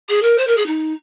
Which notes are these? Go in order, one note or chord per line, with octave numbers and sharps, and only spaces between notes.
G#4
A#4
C5
A#4
G#4
D#4